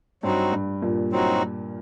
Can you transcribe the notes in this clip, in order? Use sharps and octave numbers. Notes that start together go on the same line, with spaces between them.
G2 F#3 C4 D#4 F#4
G2
G2 A#2
F#3 C4 D#4 F#4